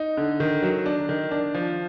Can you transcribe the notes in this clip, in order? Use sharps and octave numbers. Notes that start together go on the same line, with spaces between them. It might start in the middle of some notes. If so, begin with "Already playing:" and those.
Already playing: D#4
D3
D#3
F#3
D4
D#3
D4
F3